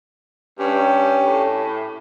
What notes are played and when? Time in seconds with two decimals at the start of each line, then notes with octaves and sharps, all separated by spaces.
0.59 G2 C#4 G4
1.24 A2